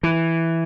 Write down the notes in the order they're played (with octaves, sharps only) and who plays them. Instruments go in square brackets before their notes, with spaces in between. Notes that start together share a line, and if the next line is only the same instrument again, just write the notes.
[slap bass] E3